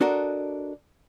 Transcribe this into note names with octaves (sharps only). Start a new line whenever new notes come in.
D4 F#4 A4 A#4 D#5